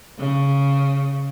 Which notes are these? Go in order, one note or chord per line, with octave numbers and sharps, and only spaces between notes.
C#3